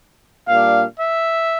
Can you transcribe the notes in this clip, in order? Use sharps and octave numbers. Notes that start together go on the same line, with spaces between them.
A#2 G3 D4 F5
E5